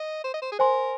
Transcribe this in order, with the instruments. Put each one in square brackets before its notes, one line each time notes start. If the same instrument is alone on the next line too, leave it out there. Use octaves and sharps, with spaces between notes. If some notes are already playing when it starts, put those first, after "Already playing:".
Already playing: [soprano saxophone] D#5
C5
D#5
C5
G#4
[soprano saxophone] A#4 [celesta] C5 G#5 C6